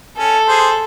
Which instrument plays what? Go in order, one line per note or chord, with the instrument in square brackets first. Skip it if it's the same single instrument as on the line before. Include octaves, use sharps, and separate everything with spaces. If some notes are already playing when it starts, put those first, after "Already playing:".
[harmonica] C#4 [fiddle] A4
[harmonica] G#4 C5